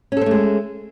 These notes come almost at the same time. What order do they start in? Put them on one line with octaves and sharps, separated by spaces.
C#4 A4 C4 A3 G#3